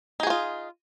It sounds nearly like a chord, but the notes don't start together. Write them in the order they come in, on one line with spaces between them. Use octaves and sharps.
D#4 G#4 F#4 F4